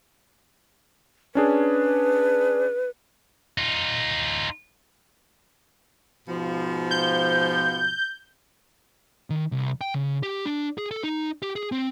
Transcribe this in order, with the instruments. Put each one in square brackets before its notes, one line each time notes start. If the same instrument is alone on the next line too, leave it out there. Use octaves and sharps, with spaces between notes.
[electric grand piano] C#4 D4 G#4 [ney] B4
[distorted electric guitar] D#4 F4
[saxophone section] G#2 B2 F3
[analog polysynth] G6
[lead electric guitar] D#3
C2
G5
C#3
G4
D4
G#4
A4
D#4
G4
G#4
C4